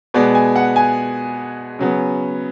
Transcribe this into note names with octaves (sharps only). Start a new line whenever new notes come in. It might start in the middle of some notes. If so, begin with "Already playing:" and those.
B2 G#3 B3 D5
G#5
F#5
G#5
C#3 F#3 B3